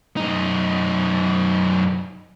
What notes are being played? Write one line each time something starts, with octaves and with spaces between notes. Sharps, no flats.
F#2 D#4